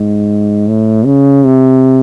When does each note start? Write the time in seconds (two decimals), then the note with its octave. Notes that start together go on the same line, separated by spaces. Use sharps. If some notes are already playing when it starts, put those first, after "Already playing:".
Already playing: G#2
0.69 A2
1.06 C#3
1.44 C3